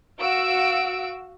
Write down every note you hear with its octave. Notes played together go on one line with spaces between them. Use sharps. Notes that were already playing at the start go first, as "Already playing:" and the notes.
F#4 F5 E6 D7